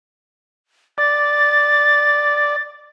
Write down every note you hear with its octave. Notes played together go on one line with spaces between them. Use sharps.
D5 A6